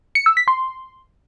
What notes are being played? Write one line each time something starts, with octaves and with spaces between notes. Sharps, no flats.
C#7
E6
B6
C6